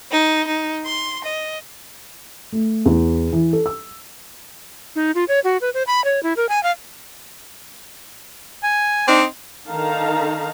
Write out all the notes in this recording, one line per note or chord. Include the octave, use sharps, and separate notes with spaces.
D#4
D#4
C6
D#5
A3
E2
E3
A4
E6
D#4
F4
C#5
F#4
B4
C5
B5
C#5
E4
A#4
G#5
F5
G#5
C4 D4 D#4
D3 D#3 D#4 F5 A5 A#5